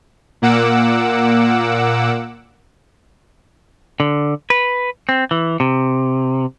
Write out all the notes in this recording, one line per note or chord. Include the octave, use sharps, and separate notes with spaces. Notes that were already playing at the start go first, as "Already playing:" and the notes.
A#2 A#3 F#5 D6 E6
D3
B4
C4
E3
C3